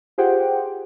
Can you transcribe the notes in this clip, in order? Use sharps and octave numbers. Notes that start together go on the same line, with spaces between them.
F4 G4 G#4 C5 F#5 G5